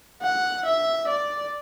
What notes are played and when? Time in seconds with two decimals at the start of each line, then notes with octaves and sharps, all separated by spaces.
0.22 F#5
0.65 E5
1.08 D5